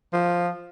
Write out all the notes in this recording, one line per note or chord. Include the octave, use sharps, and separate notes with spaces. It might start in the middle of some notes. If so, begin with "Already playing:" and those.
F3